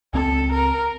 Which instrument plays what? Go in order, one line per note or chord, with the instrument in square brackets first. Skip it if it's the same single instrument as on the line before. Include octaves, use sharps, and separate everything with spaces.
[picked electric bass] C#2 C4 [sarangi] A4
[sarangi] A#4